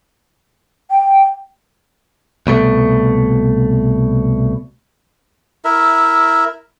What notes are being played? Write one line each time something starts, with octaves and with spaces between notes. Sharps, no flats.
G5
C2 B2 A3
E4 A#4 E5